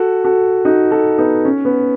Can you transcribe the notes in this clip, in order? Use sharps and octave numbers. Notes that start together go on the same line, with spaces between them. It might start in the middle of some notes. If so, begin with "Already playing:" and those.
Already playing: F#4 A4
F#4 A4
D#4 F#4
F#4 A4
B3 D#4
C#4
B3